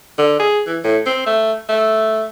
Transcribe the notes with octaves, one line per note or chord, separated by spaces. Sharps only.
D3
G#4
E3
A2
C4
A3
A3